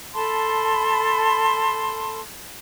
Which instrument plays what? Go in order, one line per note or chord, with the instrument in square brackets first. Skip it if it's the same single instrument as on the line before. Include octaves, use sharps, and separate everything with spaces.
[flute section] A4 A5 B5 C6